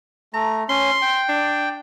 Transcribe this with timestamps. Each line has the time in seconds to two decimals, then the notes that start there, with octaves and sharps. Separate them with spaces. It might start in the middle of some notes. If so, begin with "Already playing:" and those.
0.34 A3 A#5
0.69 C#4 C6
1.02 G5
1.29 D4